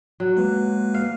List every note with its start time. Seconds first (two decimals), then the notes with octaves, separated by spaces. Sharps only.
0.20 F#3
0.37 G#3 A#3 B4
0.94 F5